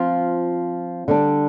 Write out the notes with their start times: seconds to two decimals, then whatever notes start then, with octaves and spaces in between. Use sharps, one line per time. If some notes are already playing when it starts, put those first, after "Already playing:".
Already playing: F3 C4 F4
1.08 D3 G3 D4